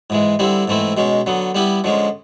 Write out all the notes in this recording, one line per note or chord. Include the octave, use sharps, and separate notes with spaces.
G#2 E3 G#3
D3 G3 C4 E4
G#2 E3 A3 C4 E4
B2 G#3 C#4
D3 F#3 B3
G3 B3 E4 G4
D3 F3 G#3 C#4